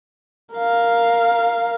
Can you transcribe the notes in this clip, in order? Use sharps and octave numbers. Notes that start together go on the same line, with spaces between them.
A#4 F5